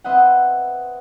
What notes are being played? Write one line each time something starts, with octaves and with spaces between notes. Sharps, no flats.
C4 B4 D#5 E5 F#5